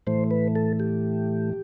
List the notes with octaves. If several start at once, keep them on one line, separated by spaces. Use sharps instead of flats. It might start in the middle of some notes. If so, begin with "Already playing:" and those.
A2 E3 A3 C5
B4
A4
G4